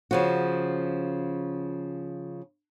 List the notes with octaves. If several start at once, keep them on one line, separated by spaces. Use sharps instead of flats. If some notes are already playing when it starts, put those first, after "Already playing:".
C#3 F3 F#4